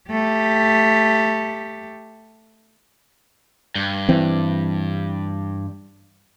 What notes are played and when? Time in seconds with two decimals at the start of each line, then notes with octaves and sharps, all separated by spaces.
0.10 A3 G4
3.75 G2
4.09 E3 C4